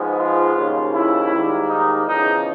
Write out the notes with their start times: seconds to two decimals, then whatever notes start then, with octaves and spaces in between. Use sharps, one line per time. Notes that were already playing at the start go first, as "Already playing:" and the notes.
Already playing: G#2 F3 G#3 B3
0.19 F4
0.56 D#2 C#3 F3
0.94 E4
1.31 G#2 D#3 G3 A#3
1.69 D#4
2.07 E2 C#3 F3 D#4